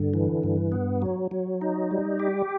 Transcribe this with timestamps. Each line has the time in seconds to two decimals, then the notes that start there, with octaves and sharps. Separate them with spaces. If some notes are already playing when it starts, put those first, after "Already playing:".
Already playing: G2 D3
0.14 E3
0.43 G2
0.72 B3
1.02 F#3
1.31 F#3
1.61 D#4
1.91 G3
2.20 G4